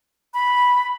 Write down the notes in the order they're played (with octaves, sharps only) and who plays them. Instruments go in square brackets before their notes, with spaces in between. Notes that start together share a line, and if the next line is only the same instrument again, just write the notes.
[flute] B5